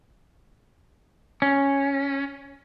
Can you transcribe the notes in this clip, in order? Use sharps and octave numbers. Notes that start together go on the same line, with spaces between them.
C#4